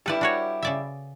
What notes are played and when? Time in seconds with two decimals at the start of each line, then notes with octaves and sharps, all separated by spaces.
0.06 G3 E4 A4 B4 D5
0.21 D4 F#4 C#5
0.62 C#3 D5 E5